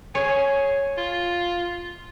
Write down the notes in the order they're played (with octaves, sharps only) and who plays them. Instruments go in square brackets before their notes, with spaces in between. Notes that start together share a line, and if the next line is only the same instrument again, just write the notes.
[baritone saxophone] G#4 [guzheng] C#5
[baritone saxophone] F4